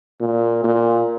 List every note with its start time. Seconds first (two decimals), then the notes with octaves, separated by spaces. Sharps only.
0.20 A#2
0.64 A#2